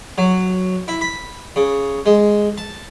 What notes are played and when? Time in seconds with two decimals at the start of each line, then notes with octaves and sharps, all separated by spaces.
0.18 F#3
0.88 E4
1.01 B5
1.56 C#3
2.06 G#3
2.58 A5